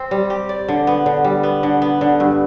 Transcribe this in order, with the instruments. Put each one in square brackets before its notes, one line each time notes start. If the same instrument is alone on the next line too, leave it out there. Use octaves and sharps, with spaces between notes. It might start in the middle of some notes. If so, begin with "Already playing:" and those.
Already playing: [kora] C4
G3
G4
D5
D3
B3
D3
G3
B3
D3
B3
D3
G2